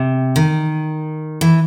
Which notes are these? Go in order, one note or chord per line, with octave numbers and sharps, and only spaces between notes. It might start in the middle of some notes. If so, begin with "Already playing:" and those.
Already playing: C3
D#3
E3